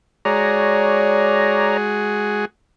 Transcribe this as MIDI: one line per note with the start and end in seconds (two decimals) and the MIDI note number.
0.25 2.45 56
0.25 2.45 66
0.25 2.45 68
0.25 1.77 73
0.25 1.77 74
0.25 1.77 82